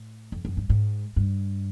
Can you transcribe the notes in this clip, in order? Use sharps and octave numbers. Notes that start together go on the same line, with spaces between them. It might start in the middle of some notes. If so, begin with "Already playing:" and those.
Already playing: A2
F2
F#2
G2
G#2
G2